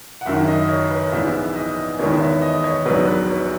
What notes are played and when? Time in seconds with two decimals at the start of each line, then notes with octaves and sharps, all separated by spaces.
0.21 F#5
0.25 F#1 F#2 D#3 E5
0.48 D#5
0.69 C#5
0.90 B4
1.12 A#1 G#2 E3 B3 E5
1.55 D#5
1.99 E2 D#3 G#3 B3 C#5
2.21 E5
2.42 D#5
2.64 C#5
2.86 A#1 G#2 F#3 B3 B4
3.07 B4
3.29 C#5